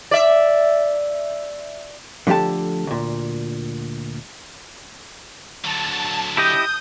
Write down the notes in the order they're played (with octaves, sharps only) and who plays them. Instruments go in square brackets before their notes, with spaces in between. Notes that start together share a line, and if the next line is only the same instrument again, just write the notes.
[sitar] D5 E5
[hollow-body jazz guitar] D3 F3 A3 G4 A5
D2 A#2
[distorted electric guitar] D3 F#3 [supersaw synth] A5
[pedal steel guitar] E4 G4 D#5 [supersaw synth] D#6 [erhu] G6